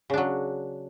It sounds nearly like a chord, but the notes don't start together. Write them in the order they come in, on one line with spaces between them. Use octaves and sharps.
C#3 D4 F#3